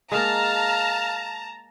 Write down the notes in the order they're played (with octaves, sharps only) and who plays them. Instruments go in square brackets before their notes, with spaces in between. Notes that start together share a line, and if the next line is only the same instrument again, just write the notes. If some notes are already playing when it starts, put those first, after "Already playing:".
[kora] G#3 A#3 [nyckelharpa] F5 [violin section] A5 A#5